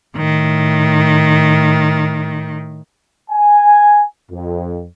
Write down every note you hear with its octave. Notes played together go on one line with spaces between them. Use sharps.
A2 D#3
G#5
F2